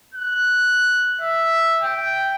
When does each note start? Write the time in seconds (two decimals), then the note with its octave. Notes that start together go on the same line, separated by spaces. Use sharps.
0.14 F#6
1.21 E5
1.81 G5